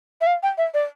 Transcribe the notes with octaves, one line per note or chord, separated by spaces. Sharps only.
E5
F5
G5
E5
D5